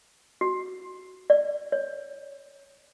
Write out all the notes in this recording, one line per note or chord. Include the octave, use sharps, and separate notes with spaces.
F#4
D5
C#5